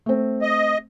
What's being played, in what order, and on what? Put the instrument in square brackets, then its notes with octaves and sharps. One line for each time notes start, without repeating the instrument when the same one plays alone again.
[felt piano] A3 C4
[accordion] D#5